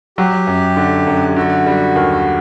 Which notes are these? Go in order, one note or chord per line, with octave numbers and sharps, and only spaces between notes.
F#3 G4
F#2
D3
F#2
D3 F#4
G3
D#2